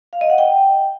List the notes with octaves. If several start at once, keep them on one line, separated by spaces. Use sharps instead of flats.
F5
D#5
F#5
G5